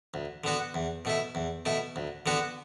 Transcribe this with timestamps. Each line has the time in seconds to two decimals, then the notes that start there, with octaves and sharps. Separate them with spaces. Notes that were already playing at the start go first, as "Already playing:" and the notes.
0.14 D2
0.44 D3 B3 F#4
0.74 E2
1.05 B2 A3 E4
1.35 E2
1.65 B2 A3 E4
1.96 D2
2.26 D3 B3 F#4